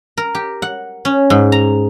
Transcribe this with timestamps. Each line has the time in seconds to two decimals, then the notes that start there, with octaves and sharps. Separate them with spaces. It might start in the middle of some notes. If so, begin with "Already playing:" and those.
0.17 A#4
0.35 G4
0.62 F#5
1.05 C#4
1.30 G#2
1.52 A#5